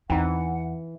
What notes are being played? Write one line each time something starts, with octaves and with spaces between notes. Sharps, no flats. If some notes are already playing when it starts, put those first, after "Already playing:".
E2 E3 C4 D#4 F#5